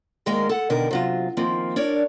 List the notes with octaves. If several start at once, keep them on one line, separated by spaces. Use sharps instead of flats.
D2 D#3 G#3 A#3 A#4 F5
A4 F#5
B2 D3 D#3 A#4
C3 F#3 F4
D#3 F3 A#3 C4
D4 A#4 C#5 D5